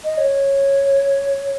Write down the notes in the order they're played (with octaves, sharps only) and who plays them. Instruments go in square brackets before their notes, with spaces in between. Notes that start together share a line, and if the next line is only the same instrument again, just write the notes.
[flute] D#5
C#5